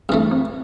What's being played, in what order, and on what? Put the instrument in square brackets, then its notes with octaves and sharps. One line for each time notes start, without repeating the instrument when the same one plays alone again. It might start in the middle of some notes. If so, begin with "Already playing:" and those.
[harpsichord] G2 E3 A3 [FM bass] C4
[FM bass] C4